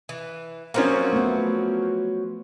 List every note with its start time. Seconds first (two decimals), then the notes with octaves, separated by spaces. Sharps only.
0.09 E3
0.74 F3 F#3 A#3 C4 C#4 F#4
1.13 A3 B3